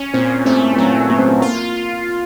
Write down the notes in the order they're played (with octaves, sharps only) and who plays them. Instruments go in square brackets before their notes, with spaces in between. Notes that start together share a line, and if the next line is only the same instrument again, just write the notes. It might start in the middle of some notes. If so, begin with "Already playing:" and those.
Already playing: [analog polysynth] C#4
[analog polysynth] A#2 [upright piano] C4
[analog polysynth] A3 [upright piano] C4
[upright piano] B3
[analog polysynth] F#3 [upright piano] C4
[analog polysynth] A#2 [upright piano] B3
[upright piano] C4
B3
[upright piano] A#3 [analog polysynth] F4